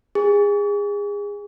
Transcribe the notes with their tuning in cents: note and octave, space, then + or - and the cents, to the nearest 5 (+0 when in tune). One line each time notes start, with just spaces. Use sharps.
G#4 -25